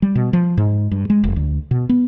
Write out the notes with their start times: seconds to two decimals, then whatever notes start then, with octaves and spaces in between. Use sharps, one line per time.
0.02 G3
0.15 B2
0.33 F3
0.57 G#2
0.91 G2
1.10 G#3
1.24 F1
1.36 D2
1.71 B2
1.89 B3